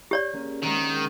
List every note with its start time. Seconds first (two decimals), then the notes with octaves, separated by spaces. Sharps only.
0.11 G4 C#5 D5
0.33 A#3 C#4 G#4
0.62 D#3 G#3 C4 F#5